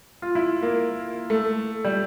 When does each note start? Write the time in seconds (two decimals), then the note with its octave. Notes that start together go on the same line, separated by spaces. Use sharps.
0.22 F4
0.35 E4
0.63 A#3
1.30 A3
1.84 G3